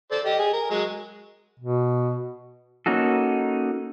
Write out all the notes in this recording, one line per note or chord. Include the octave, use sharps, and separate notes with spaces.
A4 C5 D5
G4 D#5
G#4
A#4
F#3 G#3
B2
A#3 C#4 D#4 F#4 A4